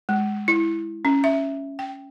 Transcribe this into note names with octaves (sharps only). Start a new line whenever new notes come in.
G#3
E4
C#4
E5
G5